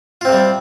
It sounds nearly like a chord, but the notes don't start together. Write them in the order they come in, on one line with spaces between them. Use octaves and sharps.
F4 C4 C3 G3